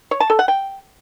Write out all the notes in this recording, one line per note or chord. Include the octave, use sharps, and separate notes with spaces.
C#5
A5
A4
F#5
G5